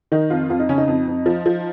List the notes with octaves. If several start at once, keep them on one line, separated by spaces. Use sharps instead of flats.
D#3 D#4
F2 F4
F2 F4
D#4
C#3 C#4
D#4
F2
F2
F3
F3